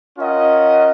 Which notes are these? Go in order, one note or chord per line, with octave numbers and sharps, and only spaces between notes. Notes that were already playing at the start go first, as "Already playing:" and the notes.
C#4 F4 A#4 D#5 F#5